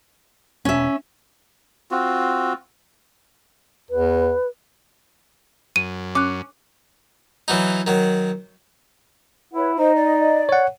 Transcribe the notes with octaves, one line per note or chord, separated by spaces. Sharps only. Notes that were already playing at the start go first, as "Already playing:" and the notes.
E1 C#4 E5
C4 F4 F#4
E2 B4
F#2 D#7
C#4 D6 F#6
E3 F#3 D#4
D#3 F#3
E4 B4 C#5 F#5
D#4 C5 D#5
D5
C#5 F#5